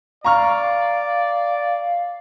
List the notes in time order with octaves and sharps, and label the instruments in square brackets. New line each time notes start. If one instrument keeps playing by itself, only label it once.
[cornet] D5 [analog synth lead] F5 [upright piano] A#5 C#6 F6